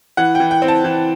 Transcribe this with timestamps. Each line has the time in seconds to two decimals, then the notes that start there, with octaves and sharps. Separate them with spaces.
0.17 E3 F#5
0.35 G5
0.40 E3
0.51 G5
0.62 C4
0.68 A5
0.84 E3